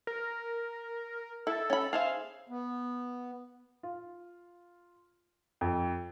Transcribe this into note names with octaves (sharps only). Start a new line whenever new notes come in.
A#4
E4 A4
C#4 B5
G#4 C5 E5 F5
B3
F4
F2